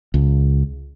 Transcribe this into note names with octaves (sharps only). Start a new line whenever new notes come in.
C#2